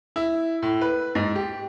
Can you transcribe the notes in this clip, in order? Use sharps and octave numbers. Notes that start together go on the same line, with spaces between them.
E4
A2
B4
G#2
G4